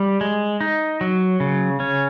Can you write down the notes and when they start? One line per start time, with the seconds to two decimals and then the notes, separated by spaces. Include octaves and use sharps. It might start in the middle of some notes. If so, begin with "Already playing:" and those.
Already playing: G3
0.21 G#3
0.61 D#4
1.01 F#3
1.40 C#3
1.80 C#4